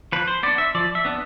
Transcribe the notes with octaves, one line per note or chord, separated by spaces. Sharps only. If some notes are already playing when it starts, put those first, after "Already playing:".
F3 B4
C5
B3 D4 D5
E5
F3 D5
E5
B3 D4